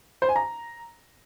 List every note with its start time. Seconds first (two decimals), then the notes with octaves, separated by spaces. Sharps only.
0.22 C5
0.29 G#5
0.36 A#5